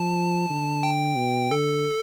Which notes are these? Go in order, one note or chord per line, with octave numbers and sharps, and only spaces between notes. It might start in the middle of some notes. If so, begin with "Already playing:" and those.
Already playing: F3 A5
D3
G5
B2
D3 A4